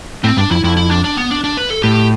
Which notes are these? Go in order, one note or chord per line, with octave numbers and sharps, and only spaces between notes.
A2 C4
G2 D4
F2 E4
F2 E4
E4
D4
D4
B3
D4
D4
B4
A4
A2 G4